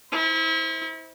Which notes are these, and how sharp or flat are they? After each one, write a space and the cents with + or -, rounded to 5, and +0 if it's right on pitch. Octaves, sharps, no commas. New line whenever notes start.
E4 -30 C5 +0